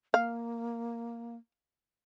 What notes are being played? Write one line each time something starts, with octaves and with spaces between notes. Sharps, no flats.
A#3 F5